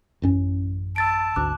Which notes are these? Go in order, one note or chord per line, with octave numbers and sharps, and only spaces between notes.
A1 F#2 C#4
A5 E6 A6 D7
G#1 D2 D6 F#6